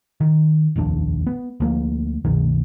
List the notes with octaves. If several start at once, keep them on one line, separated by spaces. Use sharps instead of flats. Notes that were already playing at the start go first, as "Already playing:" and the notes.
D#3
F1 A#1 D#2 D4
B3
D2 F3 A#3
C2 F#2 B2 D#3